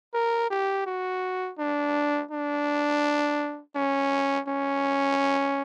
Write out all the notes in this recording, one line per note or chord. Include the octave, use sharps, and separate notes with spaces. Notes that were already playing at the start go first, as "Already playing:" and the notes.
A#4
G4
F#4
D4
D4
C#4
C#4